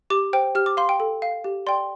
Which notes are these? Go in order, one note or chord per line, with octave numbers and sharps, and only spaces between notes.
G4 D6
C5 G5
G4 F6
D6
F5 C6
G5
A4
F5
G4
D5 G5 C6